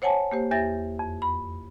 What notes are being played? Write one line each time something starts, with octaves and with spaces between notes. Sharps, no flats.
C5 C#5 F#5 G#5 A5
A#3 G4 C5
E2 G4 E5 A6 A#6
F2
B5